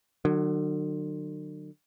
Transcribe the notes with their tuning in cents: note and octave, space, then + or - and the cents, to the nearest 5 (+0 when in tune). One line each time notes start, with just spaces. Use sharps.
D3 +45 F#3 +5